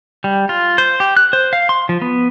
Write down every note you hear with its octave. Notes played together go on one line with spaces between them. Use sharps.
G3
F4
C5
G4
F#6
C5
F5
C6
F3
B3